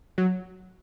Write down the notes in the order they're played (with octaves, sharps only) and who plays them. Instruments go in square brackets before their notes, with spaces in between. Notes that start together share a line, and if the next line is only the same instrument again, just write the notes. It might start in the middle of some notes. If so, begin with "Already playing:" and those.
[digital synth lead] F#3